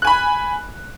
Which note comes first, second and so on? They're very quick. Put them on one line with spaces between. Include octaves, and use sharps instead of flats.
F#6 G#5 B5